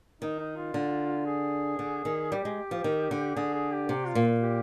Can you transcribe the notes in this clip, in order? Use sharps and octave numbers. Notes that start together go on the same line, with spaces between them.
D#3 D#4
D#4
F4
D3
G#4
D3
D#3
G3 G4
G#3
F3
D#3
D3
D3 G#4
G#4
G4
C3 G4
F4
A#2
G4